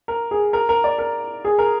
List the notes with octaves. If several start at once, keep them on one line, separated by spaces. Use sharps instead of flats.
A#4
G#4
A#4
A#4
D5
A#4
G#4
A#4